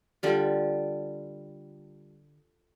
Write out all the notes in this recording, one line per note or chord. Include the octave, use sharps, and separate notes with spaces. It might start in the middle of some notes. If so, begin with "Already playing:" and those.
D3 G3 F4